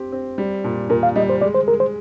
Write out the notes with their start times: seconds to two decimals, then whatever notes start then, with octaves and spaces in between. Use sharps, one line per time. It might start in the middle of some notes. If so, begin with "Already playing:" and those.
Already playing: C4 G4
0.12 C4
0.38 G3
0.64 A#2
0.90 A#2 A#4
1.03 F5
1.16 G3 D#5
1.30 C5
1.41 G#3 D5
1.55 C5
1.68 G#3 A#4
1.80 C5